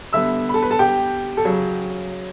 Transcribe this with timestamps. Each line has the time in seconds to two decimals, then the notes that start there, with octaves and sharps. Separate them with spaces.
0.13 D3 G3 B3 E5 E6
0.49 B5
0.54 A4 A5
0.63 B4 B5
0.70 A4 A5
0.79 G4 G5
1.37 A4
1.45 C#3 F#3